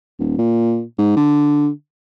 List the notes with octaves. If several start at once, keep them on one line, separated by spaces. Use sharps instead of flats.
D#1
A#2
G#2
D3